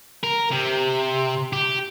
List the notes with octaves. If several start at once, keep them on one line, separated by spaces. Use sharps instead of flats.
A#4
C3
G4